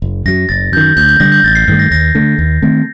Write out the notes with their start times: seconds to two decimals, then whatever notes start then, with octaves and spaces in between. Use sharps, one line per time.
0.02 F#1
0.25 F#2 F#3 A#6
0.49 F#1 A6
0.72 F#2 D#3 G6
0.97 D2 G6
1.08 G6
1.20 D3 G3 D4 A#6
1.32 G6
1.44 A1 A6
1.55 C7
1.68 G2 D#3 A3 C7
1.79 A#6
1.91 D#2 A#6
2.15 D3 A3
2.38 D#2
2.62 D#3 A3 C4